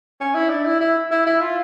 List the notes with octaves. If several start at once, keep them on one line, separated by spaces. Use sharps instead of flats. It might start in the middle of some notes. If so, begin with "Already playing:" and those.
C#4
E4
D4
E4
E4
E4
E4
F4